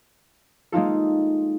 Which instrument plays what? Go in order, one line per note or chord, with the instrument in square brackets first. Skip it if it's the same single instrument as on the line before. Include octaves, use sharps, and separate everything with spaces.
[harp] G#3 A#3 D#4 F4 A4